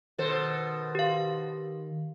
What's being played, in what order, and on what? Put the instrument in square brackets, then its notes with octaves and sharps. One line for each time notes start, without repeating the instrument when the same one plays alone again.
[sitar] B2 A4 C5 [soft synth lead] D#3
[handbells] G4 F5